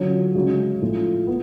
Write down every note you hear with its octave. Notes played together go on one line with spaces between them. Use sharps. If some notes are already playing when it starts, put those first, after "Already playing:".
Already playing: D3 F#3 C#4 F4
C#3 G#3 C#4 F#4
A2 F3 A3 F4
B3